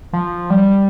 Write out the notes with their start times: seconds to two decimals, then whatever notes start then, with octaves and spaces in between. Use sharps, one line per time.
0.13 F3
0.50 G3